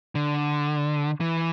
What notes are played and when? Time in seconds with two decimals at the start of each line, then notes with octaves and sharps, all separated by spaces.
0.15 D3
1.21 E3